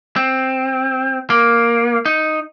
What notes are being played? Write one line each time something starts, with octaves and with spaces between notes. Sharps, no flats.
C4
A#3
D#4